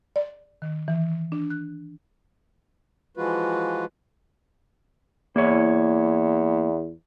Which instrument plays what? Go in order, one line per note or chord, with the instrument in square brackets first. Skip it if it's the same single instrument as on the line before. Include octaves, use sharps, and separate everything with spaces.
[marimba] D5
D#3
E3
D4
F#6
[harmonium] E3 F3 G#3 F4 F#4 B4
[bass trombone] E2 [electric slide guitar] A#3 E4 C#5